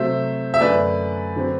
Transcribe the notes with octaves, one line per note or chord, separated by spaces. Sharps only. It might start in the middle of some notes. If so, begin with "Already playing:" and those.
Already playing: C3 F#3 A3 C5 E5
E5
F#2 D3 A3 B4 D5
D3 F#3 C4